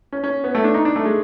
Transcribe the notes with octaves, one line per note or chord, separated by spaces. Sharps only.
C#4
C#4
B3
A3
D4
D#4
D4
A3
G#3